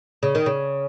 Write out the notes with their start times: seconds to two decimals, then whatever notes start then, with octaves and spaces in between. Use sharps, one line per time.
0.23 C#3
0.35 D#3
0.46 C#3